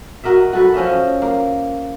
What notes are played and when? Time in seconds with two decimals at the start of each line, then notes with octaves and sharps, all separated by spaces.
0.24 F#4 A#4 D#5 E5
0.53 F#4 A4 B4
0.74 F3 C#4 D#5 E5
1.22 A#3